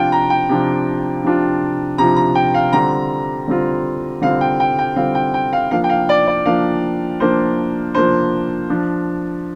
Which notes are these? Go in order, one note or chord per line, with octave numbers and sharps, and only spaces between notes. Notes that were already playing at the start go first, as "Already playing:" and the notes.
Already playing: C3 F3 D4 F4 F5 G5
A#5
G5
C3 F3 D4 F4
C3 F3 D4 F4
C3 F3 D4 F4 A#5
A#5
G5
F5
D3 G3 C4 F4 A#5
D3 G3 C4 F4
D3 G3 C4 F4 F5
G5
G5
G5
D3 G3 C4 F4 F5
G5
G5
F5
F3 A#3 D4 F5
G5
F5
D5
D5
F3 A#3 D4 F5
F3 A#3 D4 C5
F3 A#3 D4 C5
F3 D4 F4